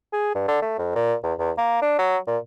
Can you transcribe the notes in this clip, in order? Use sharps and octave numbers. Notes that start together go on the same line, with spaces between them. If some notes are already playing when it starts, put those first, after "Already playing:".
G#4
G2
D3
A3
F2
A#2
E2
E2
A#3
D4
F#3
A#2